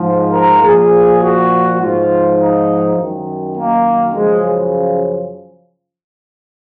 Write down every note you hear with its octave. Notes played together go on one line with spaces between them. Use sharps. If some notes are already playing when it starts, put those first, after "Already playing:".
Already playing: G#2 F3
A#4
A#2 F3 G#4
F#4
G#2 F3 F4
D#4
F#2 D#3
A#3
F#2 C#3 F3 G#3